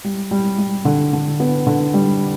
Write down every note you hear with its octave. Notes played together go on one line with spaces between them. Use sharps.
G3
G3
G3
D3
D3
B3
D3
G3